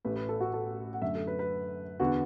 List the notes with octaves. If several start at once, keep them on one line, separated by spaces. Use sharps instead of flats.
A1 A2 A3 B4
B4
A4
F#4
A4
F#5
F#2 D3 A3 E5
A4
B4
B4
E2 D3 B3 F#4